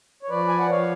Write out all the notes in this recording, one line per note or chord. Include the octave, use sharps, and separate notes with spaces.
C#5
F3 B4 D5
G#5
F#5
F3 C#5 F5